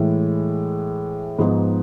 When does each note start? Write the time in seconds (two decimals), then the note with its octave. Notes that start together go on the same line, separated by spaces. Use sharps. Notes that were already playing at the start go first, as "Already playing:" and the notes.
Already playing: A2 E3 G#3
1.39 G#2 F3 G#3 B3 D#4